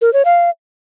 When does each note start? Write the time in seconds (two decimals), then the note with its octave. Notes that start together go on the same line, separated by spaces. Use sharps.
0.01 A#4
0.13 C#5
0.25 F5